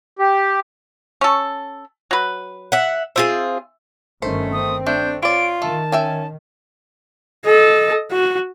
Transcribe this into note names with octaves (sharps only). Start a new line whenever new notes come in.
G4
C#4 A4
F#3 B4
E5 F#5
C4 F4 G#4 E5
G1 D#3 A3 C#4 C5
C4 D#6
A3 D4 G6
F4 C#5 D5 D7
D#3 A3 A5
C#4 E5 G5 G#5
A4 D#5
F#4